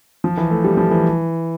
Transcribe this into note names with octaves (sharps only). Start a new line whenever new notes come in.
F3
E3
A3
G3
F3
E3